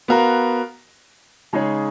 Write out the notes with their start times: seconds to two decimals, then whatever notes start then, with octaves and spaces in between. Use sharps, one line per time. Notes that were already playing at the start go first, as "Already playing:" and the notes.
0.08 B3 F#4 A#4 F5
1.53 C#3 G#3 D#4 G#4 C#5